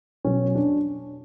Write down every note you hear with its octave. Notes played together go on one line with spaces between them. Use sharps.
B2 F#3 C#4
D4